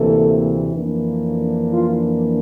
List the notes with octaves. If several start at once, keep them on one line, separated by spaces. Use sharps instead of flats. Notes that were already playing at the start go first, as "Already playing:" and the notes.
Already playing: D2 C3 E3 A#3 A4
F2 E3 A#3 D4
F4